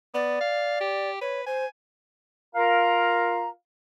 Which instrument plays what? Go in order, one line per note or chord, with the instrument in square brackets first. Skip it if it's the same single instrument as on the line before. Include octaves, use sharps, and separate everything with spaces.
[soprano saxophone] B3 [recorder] D5
[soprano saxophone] F5
G4
[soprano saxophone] B4 [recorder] C#5
[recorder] C5 [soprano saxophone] G#5
[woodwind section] F4 A#4 F5 A#5